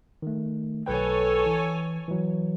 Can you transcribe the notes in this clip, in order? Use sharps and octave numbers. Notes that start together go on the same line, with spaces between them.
D#3 A3
B1 A4 B4 C#5 G5 G#5
E3
E3 F#3